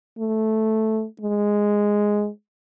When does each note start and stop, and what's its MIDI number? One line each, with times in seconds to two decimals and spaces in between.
0.19 1.06 57
1.21 2.30 56